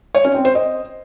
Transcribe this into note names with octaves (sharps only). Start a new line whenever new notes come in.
C#5
C#4
C4
C5
D#5